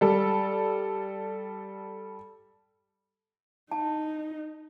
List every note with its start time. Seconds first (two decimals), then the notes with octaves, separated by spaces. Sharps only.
0.01 G3 A4
3.71 D#4 A5